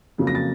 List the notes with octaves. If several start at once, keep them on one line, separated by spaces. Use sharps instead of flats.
F2 C#3 F#3 A#3
A#6
A6